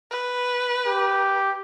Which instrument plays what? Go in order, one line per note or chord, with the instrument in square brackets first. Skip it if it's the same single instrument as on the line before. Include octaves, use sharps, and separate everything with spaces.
[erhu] B4
[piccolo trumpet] G4